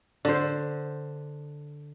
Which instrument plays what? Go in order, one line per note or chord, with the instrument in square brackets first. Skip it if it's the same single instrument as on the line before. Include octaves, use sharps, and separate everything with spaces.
[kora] D3 C5